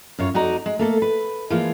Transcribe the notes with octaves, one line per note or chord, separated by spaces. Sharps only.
F#2 F4 C#5
F2 D#4 F#4 D5 A#5
G#3
A3 A#3 A4
B4
E3 F3 G#3 A#3 F4